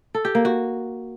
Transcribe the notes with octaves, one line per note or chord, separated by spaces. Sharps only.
A4
G4
A#3
F#4